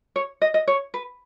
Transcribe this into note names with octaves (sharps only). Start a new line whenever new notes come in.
C#5
D#5
D#5
C#5
B4